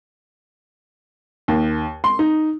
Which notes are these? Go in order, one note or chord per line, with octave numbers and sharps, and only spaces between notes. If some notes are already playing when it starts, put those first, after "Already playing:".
D#2
C6
D#4